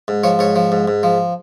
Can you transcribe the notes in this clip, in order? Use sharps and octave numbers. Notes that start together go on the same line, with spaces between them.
G#2
F3 C#5
G#2 C#5
F3
G#2
G#2
F3